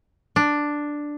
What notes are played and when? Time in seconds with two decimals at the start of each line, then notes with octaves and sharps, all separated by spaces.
0.36 D4